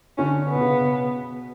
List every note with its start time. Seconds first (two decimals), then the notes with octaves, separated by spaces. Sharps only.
0.18 D3 C#4
0.49 B3
0.55 B2
0.61 C#3
0.81 B2